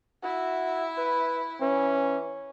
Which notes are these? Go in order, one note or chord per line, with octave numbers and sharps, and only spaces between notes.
E4 F#4 E5
B4
E3 C#4